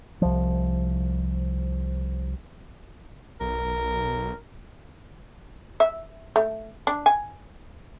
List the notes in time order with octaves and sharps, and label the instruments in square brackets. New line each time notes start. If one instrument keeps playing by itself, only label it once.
[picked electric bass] C2 F3
[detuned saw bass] B1 [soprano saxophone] A#4
[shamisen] E5
A3
D4
G#5